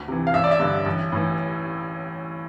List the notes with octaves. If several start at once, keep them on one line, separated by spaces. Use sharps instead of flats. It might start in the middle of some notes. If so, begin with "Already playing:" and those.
Already playing: D2
C3 E3
F5
A1 E5
D5
E5
G2 D3
A1
A2 E3